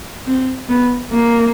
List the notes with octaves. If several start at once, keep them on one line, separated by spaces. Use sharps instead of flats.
C4
B3
A#3